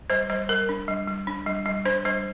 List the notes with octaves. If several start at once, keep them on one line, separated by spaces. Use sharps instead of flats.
G3 C5
G3 C5
G3 A#4
D4
G3
G3
D4
G3
G3
D4 C5
G3 C5